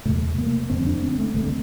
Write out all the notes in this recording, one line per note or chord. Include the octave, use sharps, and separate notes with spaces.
E2 C3 A3
A#3
F2 D3 C4
D4
C4
A3
D2 D3 A3